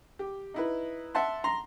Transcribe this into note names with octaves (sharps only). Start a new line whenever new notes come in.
G4
D#4 E4 B4
E5 F#5 A5 C6
A#5 C6